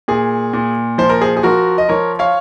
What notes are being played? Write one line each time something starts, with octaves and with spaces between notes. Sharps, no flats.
A#2 G#4
A#2
F3 C5
A#4
G#4 C5
G#4
F3 F#4 A#4
D#5
F3 A#4 C#5
C#5 F5